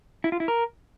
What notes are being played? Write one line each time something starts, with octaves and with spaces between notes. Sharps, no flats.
E4
F4
E4
A#4